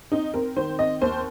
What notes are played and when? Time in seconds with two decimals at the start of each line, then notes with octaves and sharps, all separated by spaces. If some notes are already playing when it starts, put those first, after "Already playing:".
0.12 C4 D#4
0.34 C4 A#4
0.56 D#3 C5
0.79 C4 D#5
1.02 D#2 C5